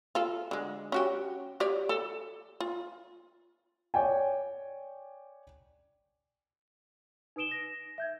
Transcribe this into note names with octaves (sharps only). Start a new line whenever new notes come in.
F4 A4
D3 G#3
C#4 F#4 G4
G4 C#5 D5
A4
F4
C#5 D5 G5 G#5
D#4 B4 D#6 D7 E7 G7
A#6
E5 G6 G#6